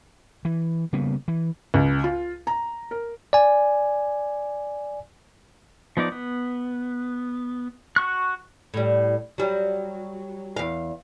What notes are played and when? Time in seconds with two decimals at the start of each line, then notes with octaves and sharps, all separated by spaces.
0.45 E3
0.93 C#3 G3 A#3 B3
1.28 E3
1.74 C#2
2.04 F4
2.47 A#5
2.91 A#4
3.33 D5 G#5
5.97 F3 B3 D#4 D5
6.12 B3
7.96 F#4 C#6 F#6
8.74 A2 G3
9.38 F#3 G3
10.57 E2 F5